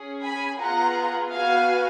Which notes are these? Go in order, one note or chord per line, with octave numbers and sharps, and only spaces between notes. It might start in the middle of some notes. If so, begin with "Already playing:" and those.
Already playing: C#4 G#4
G#5 B5
B3 F4 G#4 F#5 A#5
B3 F#4 F5 G#5